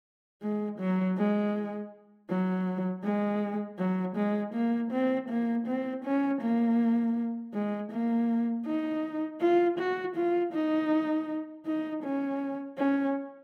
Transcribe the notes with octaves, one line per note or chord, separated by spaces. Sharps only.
G#3
F#3
G#3
F#3
G#3
F#3
G#3
A#3
C4
A#3
C4
C#4
A#3
G#3
A#3
D#4
F4
F#4
F4
D#4
D#4
C#4
C#4